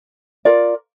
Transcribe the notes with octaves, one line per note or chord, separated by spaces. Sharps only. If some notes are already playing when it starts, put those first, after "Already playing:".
F4 A#4 D5